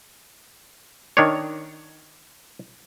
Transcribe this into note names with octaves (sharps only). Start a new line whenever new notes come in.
D#3 D4 C#5